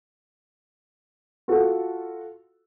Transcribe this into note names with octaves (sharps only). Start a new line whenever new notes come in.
F4 F#4 A4